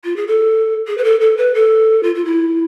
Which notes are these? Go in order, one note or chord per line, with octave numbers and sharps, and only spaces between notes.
F4
G#4
A4
G#4
B4
A4
A4
B4
A4
F4
F4
E4